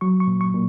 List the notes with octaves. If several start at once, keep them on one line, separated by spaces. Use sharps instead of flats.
F#3 C#6
C#6
A#2
C#6
A#2